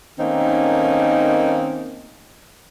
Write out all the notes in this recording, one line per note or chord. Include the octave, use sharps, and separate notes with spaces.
D#3 A3 A#3 C4 C#4 D#4